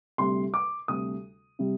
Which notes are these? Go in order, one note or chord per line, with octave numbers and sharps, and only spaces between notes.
D2 C3 G3 C6
D6
D2 C3 G3 D#6
C3 G3